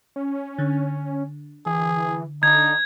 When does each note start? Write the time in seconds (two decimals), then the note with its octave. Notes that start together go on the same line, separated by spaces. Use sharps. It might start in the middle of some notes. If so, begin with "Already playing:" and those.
0.16 C#4
0.58 D3
1.66 E3 G#4
2.43 D3 D#4 G#6